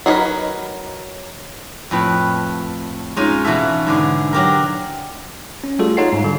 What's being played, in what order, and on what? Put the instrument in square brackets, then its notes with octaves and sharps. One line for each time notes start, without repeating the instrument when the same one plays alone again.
[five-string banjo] F#3 D#4 G#4 A#4 B4
[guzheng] F2 A2 B4
G#3 C#4 D#4 F4
B2 E3 F#4 A4 E5
G#2 D3 G#4
F#3 G4 A#4
[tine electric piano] C#4
G3 A3 F4 F#4 G#4 A4
D#4 F4 C#5 F#5 C7
G#2
D3 G3